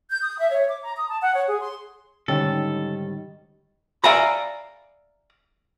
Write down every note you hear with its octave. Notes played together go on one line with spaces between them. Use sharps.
G6
D#6
E5
C#5
D6
A#5
D#6
A5
F#5
C#5
G#4
C6
G#2 D3 D#3 G3 C#4 A4 C#5
D5 E5 F5 G#5 A#5 B5